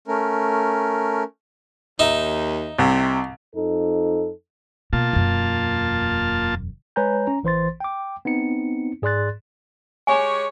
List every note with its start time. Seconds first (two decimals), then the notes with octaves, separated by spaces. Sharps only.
0.08 A3 C#4 A#4
1.99 D#2 D#4 E5
2.78 C2 C3
3.55 F2 D#4 A4
4.93 B2 A#3 F4 A5
5.13 E1 F#2
6.96 G#3 B4 C#5 G#5 A#5 G6
7.27 C#4 A#5
7.43 A1 E3 C5 C6 A6
7.80 G5 D6
8.25 B3 C4 D#4 C#7
9.02 G#2 G#4 D5 C6 F#6 A6
10.07 G#3 G4 C#5 G#5 A#5